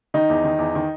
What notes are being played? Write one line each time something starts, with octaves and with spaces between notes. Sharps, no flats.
D#3 D#4
E2
D#3
E2
D#3